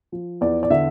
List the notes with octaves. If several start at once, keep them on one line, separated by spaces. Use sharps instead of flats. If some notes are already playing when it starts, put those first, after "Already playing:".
F3
E2 D5
D5
D3 E5